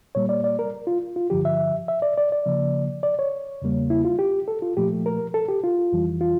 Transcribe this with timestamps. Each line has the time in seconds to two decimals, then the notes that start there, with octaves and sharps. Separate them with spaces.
0.15 A#2 G3 A#3 C#5
0.29 D5
0.44 D5
0.59 A#4
0.87 F4
1.16 F4
1.30 G2 D3 F3 G4
1.45 E5
1.88 E5
2.02 D5
2.18 D5
2.32 D5
2.46 C#3 F3 A#3
3.03 D5
3.19 C#5
3.62 E2 C#3 G3 A#3
3.90 E4
4.05 F4
4.19 G4
4.48 A4
4.62 F4
4.77 A#2 F3 A3 G4
5.06 A#4
5.34 A4
5.49 G4
5.64 F4
5.92 F2 E3 G3
6.21 F4